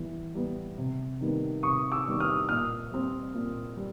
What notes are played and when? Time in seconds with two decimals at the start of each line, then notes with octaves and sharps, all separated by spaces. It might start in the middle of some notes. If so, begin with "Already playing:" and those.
Already playing: E3 G3 B3
0.35 G3 B3
0.78 C3
1.21 D#3 G3 B3
1.63 C3 C#6 D#6
1.92 D6 E6
2.06 D#3 G3 B3
2.20 D#6 F6
2.49 A#2 D#6 F6
2.91 G3 C4
3.34 A#2
3.77 G3